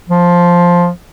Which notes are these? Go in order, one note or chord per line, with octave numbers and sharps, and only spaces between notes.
F3